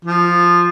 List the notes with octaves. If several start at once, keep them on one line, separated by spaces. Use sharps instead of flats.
F3